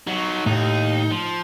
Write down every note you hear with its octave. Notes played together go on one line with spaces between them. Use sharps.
F#3 D#4 F#4
D#2 A2 D#4
F3